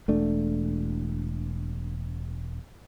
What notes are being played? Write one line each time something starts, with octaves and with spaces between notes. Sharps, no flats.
E1 A3 D4